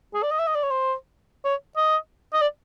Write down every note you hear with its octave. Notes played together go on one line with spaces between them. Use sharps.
G#4
D5
D#5
E5
D#5
D5
C#5
C5
C#5
D#5
D#5
D5